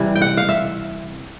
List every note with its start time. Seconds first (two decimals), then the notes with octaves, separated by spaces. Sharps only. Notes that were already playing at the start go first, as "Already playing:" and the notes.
Already playing: C3 E3 G3
0.16 G5
0.22 F#5
0.37 F5
0.49 E5